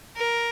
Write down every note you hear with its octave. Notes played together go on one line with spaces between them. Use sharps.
A#4